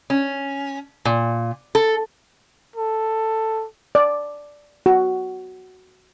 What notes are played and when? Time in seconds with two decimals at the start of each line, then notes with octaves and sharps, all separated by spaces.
0.10 C#4
1.05 A#2
1.75 A4
2.76 A4
3.95 D5
4.86 F#4